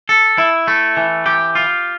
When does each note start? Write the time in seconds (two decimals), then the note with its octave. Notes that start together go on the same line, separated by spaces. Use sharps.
0.09 A4
0.38 E4
0.68 A3
0.97 E3
1.26 G4
1.55 F4